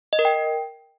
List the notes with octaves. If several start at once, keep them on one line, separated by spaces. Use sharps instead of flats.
D#5
A#4
G5